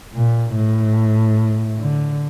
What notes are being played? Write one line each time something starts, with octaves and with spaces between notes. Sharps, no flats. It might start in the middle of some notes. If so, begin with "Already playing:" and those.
A#2
A2
D3